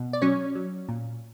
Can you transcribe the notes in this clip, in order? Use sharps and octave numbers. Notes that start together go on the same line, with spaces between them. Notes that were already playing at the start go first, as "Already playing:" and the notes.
Already playing: B2
D5
F#3 C#4 C#5
F#3
A#2